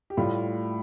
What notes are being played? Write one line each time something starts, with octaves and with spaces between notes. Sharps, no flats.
G4
A2 G3 F4